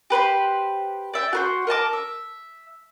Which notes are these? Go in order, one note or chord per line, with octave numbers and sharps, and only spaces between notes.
G4 B4 C5 B5
D5 E5 G5
F#4 A#4 C5
A#4 D#5 A5 D6
E5